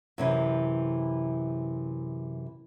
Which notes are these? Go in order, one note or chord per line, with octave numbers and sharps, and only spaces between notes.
F#2 C3 E3